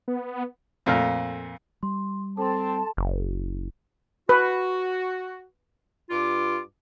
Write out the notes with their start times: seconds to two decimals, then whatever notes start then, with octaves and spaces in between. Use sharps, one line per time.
0.08 B3
0.86 F2 A#2 A3 F6
1.83 G3 C6
2.37 C4 A4 A5 C6
2.97 F#1
4.29 F#4 B4
6.10 G2 F4 D6